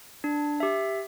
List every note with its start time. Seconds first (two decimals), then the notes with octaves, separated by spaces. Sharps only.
0.24 D4
0.60 G4 E5